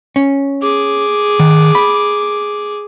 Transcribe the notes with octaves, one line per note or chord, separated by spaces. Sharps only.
C#4
G#4 D6
D#3
B5